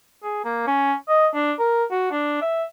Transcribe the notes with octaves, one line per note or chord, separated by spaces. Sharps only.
G#4
A#3
C#4
D#5
D4
A#4
F#4
D4
E5